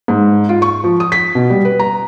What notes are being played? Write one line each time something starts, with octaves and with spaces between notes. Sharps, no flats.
G#2
F4
C#6
F3
D#6
B6
B2
G3
B4
A#5